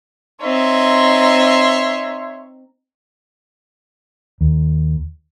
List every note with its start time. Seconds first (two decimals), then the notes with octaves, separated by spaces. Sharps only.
0.41 C4 D#4 C#5 E5 C6
4.41 D#2